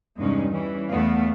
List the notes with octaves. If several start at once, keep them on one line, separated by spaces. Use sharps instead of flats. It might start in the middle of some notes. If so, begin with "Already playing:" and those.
E2 G2 C3 G#3 C#4 D#4
E3 G3 C#4
E2 A3 B3 F5